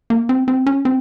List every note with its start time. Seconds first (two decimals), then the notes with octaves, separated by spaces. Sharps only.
0.10 A#3
0.29 C4
0.48 C4
0.66 C#4
0.85 C4